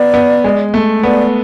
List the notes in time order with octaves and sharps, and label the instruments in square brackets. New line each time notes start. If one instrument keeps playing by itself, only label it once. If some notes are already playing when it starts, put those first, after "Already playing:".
Already playing: [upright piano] B3 [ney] D5
[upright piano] B3
G#3
A3
[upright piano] B3 [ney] D5